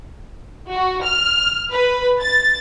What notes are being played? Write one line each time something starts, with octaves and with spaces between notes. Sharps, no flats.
F#4
F6
B4
A6